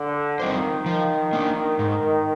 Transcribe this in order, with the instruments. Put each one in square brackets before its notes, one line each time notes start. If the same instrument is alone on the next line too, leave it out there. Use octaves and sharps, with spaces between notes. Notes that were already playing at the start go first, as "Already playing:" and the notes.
Already playing: [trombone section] D3
[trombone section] D#3 [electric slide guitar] G3 C4 F4 C5
[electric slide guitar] F3
A#3 D4
G#2